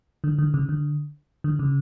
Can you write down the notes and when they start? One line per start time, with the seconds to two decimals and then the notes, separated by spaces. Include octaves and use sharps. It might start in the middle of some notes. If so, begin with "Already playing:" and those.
0.24 D3
0.39 D3
0.54 C#3
0.69 D3
1.44 D3
1.59 C#3